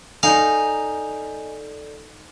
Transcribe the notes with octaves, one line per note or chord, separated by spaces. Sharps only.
D#4 A4 D5 D#5 F5 G#5 G6